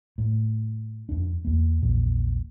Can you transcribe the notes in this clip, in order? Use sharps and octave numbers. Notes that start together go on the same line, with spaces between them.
A2
F2 D4
E2 A#3
A#1 E2 A#2